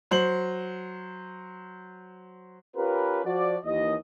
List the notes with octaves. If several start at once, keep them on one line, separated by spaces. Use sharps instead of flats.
F#3 C5 F#7
C#4 F4 G4 A#4 B4
F3 F#4 D5
D#2 E3 D#5